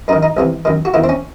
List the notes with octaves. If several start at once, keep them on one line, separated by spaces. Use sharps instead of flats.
F#2 D#3 D#4
D#4
C2 C3 E3
F#2 D#3
F#4
E2 D#3 E4
C4
C#4